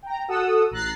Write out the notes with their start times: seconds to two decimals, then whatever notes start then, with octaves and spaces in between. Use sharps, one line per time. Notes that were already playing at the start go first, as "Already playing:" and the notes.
0.02 G5 A#5
0.28 F#4 A4 F#5 D#6 E6
0.71 A1 A#5 F#6 A6 C7